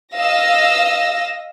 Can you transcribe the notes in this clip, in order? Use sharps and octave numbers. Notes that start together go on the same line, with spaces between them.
D#5 F5 E6 A#6